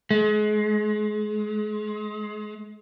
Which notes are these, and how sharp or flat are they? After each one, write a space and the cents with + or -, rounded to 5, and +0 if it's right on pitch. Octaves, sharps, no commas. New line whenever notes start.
G#3 +35